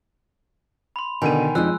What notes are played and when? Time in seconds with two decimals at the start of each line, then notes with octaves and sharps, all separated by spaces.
0.96 B5 C6
1.22 B2 D3 D#3 G#5 D#7
1.55 F2 F3 G#3 D4 D#4 E6 F#6